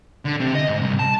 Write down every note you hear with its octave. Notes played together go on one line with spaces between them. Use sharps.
D3
C3
D#5
G#2
C2
A5